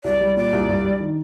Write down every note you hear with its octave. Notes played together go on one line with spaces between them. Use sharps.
C2 D5
G3
A#2 D5
C2
G2
G3
D#3